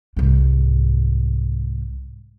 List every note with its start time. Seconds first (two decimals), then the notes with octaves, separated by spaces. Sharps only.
0.17 C2 G#2